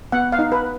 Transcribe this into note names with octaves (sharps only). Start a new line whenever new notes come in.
B3 F#5
F5
D#4
B4